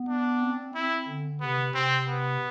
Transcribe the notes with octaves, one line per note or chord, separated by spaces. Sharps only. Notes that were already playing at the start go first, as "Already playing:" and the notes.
Already playing: B3
D4
C4
C4 E4
D3
C3 B3
C3 C4
B3